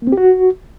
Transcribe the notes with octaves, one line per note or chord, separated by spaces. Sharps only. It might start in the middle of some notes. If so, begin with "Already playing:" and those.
A#3
C4
G4
F#4